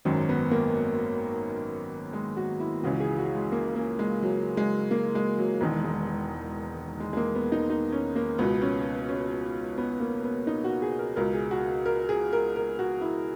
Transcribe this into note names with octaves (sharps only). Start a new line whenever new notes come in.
G#1 F#2 D#3 C#4
B3
A#3
G#3
F#4
E4
C#2 C#3 E3 F#4
G#4
F#4
G#3
A#3
A#3
G#3
F#3
G#3
A#3
G#3
F#3
E1 E2 D#3 G#3
G#3
G#3
G#3
G#3
A#3
B3
D#4
D#4
C#4
A#3
C#2 B2 B3
C#4
C#4
B3
A#3
B3
D#4
F#4
G#4
A#4
C#2 B2 A#4
G#4
F#4
A#4
G#4
A#4
A#4
F#4
E4